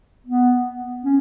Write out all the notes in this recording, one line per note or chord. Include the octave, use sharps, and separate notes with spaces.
B3
C#4